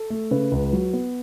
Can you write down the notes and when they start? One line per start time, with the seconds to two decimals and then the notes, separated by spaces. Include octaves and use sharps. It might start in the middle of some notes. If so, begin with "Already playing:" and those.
Already playing: A4
0.10 A3
0.31 C#3 B4
0.52 C#2
0.73 F#3
0.93 B3